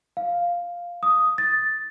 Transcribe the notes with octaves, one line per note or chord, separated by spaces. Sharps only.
F5
D#6
A6